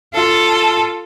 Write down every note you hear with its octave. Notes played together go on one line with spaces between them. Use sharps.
F4 A4